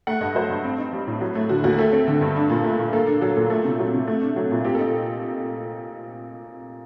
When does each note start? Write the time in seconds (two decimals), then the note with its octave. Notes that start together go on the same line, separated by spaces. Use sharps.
0.07 A3 F#5
0.21 G2 D#5
0.35 F#3 C5
0.50 G2
0.65 C4
0.78 D#4
0.93 G3
1.07 A2
1.21 F#3
1.35 A3
1.49 D3 F#4
1.64 D#2 F#4
1.79 A3 A4
1.93 C4
2.08 D3
2.21 G2
2.36 D4
2.50 A#2
2.64 A3
2.79 A#2
2.93 A#3 A4
3.07 D4
3.21 F#3 A4
3.36 A#2 A4
3.50 A3 A4
3.65 C3
3.79 F#3
3.94 C3
4.07 A3
4.22 D4
4.36 F#3
4.51 A#2
4.64 C4 G4
4.75 A4
4.79 D#4